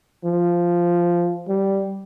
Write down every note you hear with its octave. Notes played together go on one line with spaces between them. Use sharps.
F3
G3